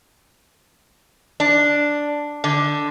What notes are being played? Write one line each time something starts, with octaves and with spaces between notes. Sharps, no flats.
D4
D3